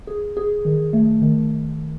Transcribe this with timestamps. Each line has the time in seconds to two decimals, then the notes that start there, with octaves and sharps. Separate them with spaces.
0.07 G#4
0.37 G#4
0.65 D#3
0.93 A3
1.22 D#3